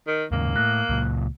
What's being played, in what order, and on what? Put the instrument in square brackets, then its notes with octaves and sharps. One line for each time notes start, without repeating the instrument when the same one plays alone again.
[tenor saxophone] D#3
[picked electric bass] D#2 G#2 C#3 [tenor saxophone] A#3
[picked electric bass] A2 [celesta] F#6
[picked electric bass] C#2 A#2